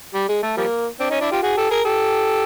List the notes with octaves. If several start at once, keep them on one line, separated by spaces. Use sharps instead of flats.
G3
G#3
A3
F3 G3 A#3
C4 D4
C#4 D#4
D4 E4
F4 G4
F#4 G#4
G4 A4
G#4 A#4
G4 A4